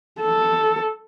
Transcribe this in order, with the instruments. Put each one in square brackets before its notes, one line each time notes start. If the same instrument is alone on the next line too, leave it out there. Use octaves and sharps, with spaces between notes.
[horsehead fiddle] A4